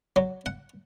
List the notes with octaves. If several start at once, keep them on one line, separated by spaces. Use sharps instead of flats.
F#3
F#5